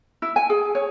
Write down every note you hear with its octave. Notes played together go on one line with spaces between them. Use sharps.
E4
G#5
G#4
C#5